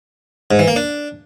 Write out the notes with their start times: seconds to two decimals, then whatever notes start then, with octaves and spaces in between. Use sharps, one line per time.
0.51 G#2
0.59 E3
0.68 A#3
0.76 D4